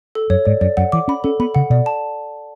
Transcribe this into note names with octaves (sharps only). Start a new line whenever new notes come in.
A4
F#2 C#5
G#2 D5
F#2 D5
F#2 F#5
E3 D6
C#4 B5
C#4 A4
B3 B5
C#3 F#5
B2 D5
A5